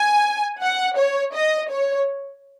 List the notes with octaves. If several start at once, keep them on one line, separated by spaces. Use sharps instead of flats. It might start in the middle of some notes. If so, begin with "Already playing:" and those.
Already playing: G#5
F#5
C#5
D#5
C#5